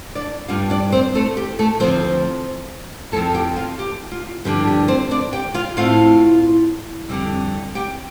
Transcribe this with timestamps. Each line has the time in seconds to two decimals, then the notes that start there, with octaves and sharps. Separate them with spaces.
0.15 D4 D5
0.48 G2 G3 D4 F4 F5
0.70 D4 D5
0.92 C4 C5
1.15 A3 A4
1.37 G4
1.59 A3 A4
1.80 D2 C3 F3 C4 C5
3.12 F2 F3 C4 A4 A5
3.34 G4 G5
3.56 F4 F5
3.79 G4
4.12 F4
4.45 G2 D3 F3 D4 G4
4.67 G4
4.88 C4 C5
5.11 D4 D5
5.33 G4 G5
5.54 F4 F5
5.77 A2 A3 C4 F4 F5
7.09 F2 D3 G3 C4
7.75 G4 G5